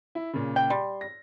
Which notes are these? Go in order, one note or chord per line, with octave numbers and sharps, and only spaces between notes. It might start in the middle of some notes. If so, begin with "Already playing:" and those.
E4
A#2 C#3
G5
G3 C6
A#6